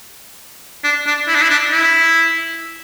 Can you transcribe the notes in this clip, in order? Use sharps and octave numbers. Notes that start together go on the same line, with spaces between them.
D4
D4
E4
D4
E4
D4
E4